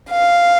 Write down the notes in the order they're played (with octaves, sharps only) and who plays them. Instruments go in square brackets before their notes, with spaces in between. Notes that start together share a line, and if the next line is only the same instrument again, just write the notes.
[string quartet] F5